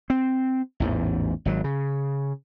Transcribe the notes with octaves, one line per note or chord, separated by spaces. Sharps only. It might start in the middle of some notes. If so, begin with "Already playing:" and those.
C4
A1 E2 G#2
G#1 B2 F#3
C#3